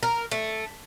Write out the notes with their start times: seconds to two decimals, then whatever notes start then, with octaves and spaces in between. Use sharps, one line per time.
0.03 A#4
0.31 A3